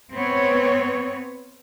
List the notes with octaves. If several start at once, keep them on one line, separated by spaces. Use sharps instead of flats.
B3 C4 C#5